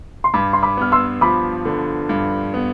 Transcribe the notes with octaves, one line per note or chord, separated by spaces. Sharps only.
C6
G2 B5 D6
C6
B5 D6
B3 F6
C6 E6
F3 B5 D6
D3
G2
B3